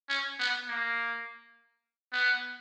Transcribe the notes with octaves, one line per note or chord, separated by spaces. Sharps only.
C#4
B3
A#3
B3